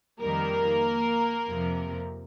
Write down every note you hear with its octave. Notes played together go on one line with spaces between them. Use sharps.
F2 D#3 G3 A#3 A#4
F2 C3 F3